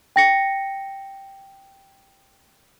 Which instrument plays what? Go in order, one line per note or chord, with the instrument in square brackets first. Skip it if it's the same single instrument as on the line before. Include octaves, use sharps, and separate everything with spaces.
[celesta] G5 A#6 C#7